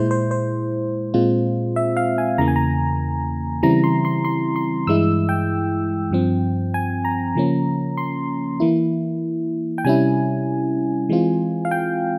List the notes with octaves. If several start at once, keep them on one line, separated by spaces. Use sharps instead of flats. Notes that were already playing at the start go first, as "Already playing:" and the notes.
Already playing: A#2 G#3 E4 C5
C5
C5
A#2 G#3 C4 F4
E5
F5
G#5
E2 C#3 E3 A#3 A#5
G#5
A#5
C#3 E3 G3 C4 E4 A#5
C6
C6
C6
C6
G2 E3 G#3 E4 E6
G5
G2 F3 C4
G#5
A#5
C#3 F3 A#3 C#4
C6
E3 A#3 E4
G5
C3 G3 C#4 E4 G#5
E3 G#3 C4 F4
F5
G5